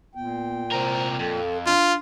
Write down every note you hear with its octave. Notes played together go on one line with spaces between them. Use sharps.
A#2 B3 G5
C3 A#4 C5
F2 A4
D4 F4